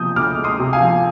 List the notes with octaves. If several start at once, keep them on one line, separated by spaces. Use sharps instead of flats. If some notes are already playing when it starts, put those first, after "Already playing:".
Already playing: C3 F3 D#6 G6
D2 D6 F6
G#3
C6 D#6
C3
F5 G#5
F3